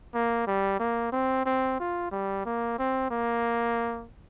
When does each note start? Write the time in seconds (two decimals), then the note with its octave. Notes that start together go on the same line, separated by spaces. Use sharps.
0.14 A#3
0.47 G3
0.80 A#3
1.12 C4
1.46 C4
1.80 F4
2.11 G3
2.46 A#3
2.79 C4
3.11 A#3